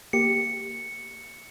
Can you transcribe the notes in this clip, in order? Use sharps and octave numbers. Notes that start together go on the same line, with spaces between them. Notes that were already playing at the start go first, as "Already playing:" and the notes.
A#3 G4 C#7